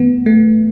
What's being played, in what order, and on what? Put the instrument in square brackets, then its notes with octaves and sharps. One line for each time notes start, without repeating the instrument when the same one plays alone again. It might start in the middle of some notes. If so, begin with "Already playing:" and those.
Already playing: [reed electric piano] G2 E3 A3 [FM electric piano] B3
[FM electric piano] A3